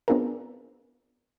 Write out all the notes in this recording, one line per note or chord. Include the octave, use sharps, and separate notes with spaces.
B3 C4 D4 F4 G#4 A#4